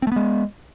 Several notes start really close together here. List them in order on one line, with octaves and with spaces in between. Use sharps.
C4 A3 B3 G#3